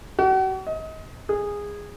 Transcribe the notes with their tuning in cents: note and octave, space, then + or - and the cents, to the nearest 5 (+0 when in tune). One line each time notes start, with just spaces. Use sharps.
F#4 +40
D#5 +30
G#4 -15